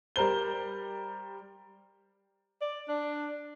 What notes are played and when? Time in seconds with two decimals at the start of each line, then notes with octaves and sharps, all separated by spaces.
0.16 G3 A#4 C5 G7
2.61 D5
2.88 D4